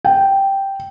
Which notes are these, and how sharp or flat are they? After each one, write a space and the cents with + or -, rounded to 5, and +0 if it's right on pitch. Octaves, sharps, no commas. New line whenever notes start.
G5 -5